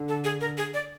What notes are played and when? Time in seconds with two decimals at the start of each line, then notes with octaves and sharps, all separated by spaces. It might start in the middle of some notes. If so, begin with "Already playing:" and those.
Already playing: D3
0.09 A4
0.24 G#4
0.41 A#4
0.58 G#4
0.74 D5